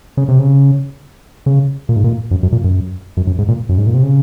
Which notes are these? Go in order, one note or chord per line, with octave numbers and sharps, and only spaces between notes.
C#3
C3
C#3
C#3
A#2
G#2
A#2
F#2
F#2
A#2
F#2
F#2
F#2
G#2
A#2
F#2
G#2
A#2
C3
C#3